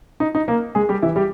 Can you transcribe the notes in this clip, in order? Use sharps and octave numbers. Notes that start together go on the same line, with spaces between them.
D#4
D#4
A#3 A#4
G#3 G#4
G3 G4
E3 E4
G3 G4